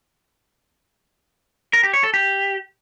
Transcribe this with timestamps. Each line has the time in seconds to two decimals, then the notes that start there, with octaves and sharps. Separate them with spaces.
1.73 A#4
1.83 G4
1.93 C#5
2.04 A4
2.14 G4